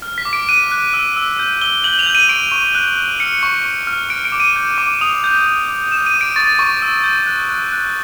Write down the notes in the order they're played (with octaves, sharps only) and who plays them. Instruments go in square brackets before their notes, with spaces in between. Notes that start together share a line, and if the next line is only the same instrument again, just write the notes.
[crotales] F6
B6
D6
D7
F#6 D#7
F#6
E6
E6
G6
E6 G7
G6 F#7
F7
G6
D#7
C#6 D7
C#6
F#6
F#6
F6 C#7
C#6
C#6
F6
F6 D7
D7
D6
D#7
G6
D6
D#6 F7
G6
D6
D6
F6 E7
D#7
D6
D7
C#6 A6
C#6
E6
G6
F#6
F#6
F#6